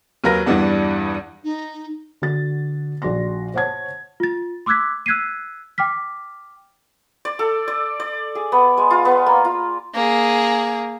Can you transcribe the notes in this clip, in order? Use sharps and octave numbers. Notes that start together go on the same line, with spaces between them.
D#2 F#3 A#4 B4 A#6
E2 G2 E3 G3 B3 D4
D#4
D3 F#4 A6
A#1 F#4 D5 C6 A#6
C5 C#5 F#5 A5 G#6
F4 A6
C6 D6 E6 F#6 G#6 B6
E6 F#6 G#6 B6 C7 D#7
G5 D6 F6 B6
D5
A4
D5
D5
G#4
B3
G#3
F4
B3
A#3
F4
A#3 G#4